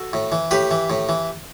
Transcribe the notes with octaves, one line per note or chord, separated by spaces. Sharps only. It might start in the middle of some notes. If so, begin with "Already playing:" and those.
Already playing: F#4 A4
A2
E3
A2 G4 B4
E3
A2
E3